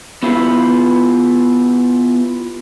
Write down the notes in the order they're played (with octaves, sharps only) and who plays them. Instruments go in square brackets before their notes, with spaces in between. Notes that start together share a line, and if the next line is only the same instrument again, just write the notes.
[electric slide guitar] B3 E4 F4 G4 B4